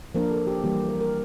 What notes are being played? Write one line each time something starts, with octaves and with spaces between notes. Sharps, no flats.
F3 A#3 D4 A#4
A4
G4
E3 G3 A#3 G4
A#4
A#4